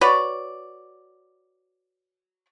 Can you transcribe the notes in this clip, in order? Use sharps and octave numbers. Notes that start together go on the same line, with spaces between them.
F#4 B4 C#5 D5